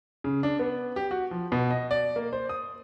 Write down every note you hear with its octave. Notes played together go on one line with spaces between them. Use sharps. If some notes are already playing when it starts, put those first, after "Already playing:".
C#3
D4
B3
G4
F#4
F3
B2
D#5
D5
A#3
C5
D#6